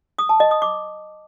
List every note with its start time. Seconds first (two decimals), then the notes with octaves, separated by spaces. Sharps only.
0.19 D#6
0.29 A5
0.40 D#5
0.51 D#6
0.62 D6